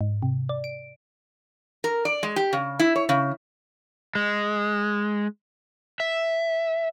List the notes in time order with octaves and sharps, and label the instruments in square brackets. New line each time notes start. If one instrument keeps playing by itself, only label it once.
[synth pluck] G#2
C3
D5
D7
[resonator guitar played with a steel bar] A#4
D5
G#3
G4
C#3
E4
C#5
C#3
[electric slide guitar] G#3
E5